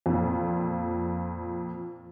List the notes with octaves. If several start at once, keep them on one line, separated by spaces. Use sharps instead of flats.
F2 A#2